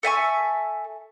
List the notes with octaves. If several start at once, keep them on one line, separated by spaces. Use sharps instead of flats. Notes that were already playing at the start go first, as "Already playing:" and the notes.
A4 E5 G#5 C#6